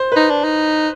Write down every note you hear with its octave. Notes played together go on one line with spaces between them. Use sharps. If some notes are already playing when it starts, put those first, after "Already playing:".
Already playing: C5
D#4 B4
D4
D#4